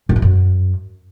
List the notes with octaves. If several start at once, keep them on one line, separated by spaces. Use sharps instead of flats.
F#2
E3
F#2